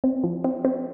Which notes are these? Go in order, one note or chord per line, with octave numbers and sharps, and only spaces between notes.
C4
F3
C4
C4